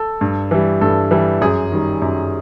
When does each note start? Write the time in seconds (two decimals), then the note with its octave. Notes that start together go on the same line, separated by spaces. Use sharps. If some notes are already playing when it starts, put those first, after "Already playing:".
Already playing: A4
0.21 G2
0.51 E3 G3
0.81 G2 A4
1.11 E3 G3
1.41 F#2 G#4
1.72 D#3 G3
2.02 F#2